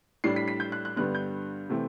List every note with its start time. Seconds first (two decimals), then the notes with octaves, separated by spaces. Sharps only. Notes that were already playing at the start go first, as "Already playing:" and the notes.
0.24 A2 G3 D4 C7
0.36 B6
0.48 B6
0.60 G6
0.72 F#6
0.85 F#6
0.96 G2 D3 G3 B3 F#6
1.15 G6
1.69 C3 E3 A3 C4